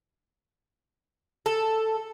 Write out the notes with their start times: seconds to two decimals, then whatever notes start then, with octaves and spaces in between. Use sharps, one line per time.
1.46 A4